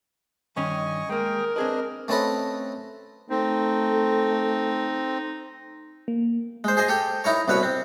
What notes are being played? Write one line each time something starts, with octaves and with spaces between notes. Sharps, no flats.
G2 D#3 C#4 D#5 G#5 C#6
G#3 A#3 G#4 A#4 G5
C4 D4 G#4 B4 D#5
A3 C4 C#4 A4 B4 D#5
A3 C4 D#4
A#3
G#3 C5
G#4 C5 D#5 G#5
G4 A4 G5
D#4 E4 A#4 C#5
C2 B2 B4 C#5 B5
C4